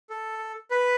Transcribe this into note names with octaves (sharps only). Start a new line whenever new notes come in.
A4
B4